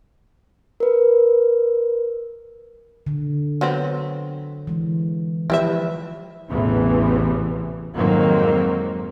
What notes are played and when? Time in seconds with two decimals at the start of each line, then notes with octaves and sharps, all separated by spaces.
0.80 A#4 B4
3.07 D3
3.61 F#3 B3 C4
4.67 E3 G#3
5.50 F3 E4 G4 B4 E5
6.50 A1 E2 A2 C3 E3
7.95 F2 G#2 D#3 F#3 A#3 C4